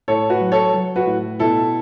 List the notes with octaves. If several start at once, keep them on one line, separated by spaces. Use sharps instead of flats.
A2 A4 C#5
F#4 B4
F#3
A4 C#5
F#3
F#4 B4
A2
B2 E4 A4